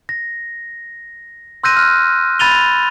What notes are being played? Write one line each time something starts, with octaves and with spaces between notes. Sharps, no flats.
A#6
C6 E6 F#6 G6 A#6 D#7
F6 F#6
B5 G#6 A6 D#7 F7 G7